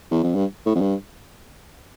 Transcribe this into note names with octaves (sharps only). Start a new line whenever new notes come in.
E2
F2
G2
A2
F2
G2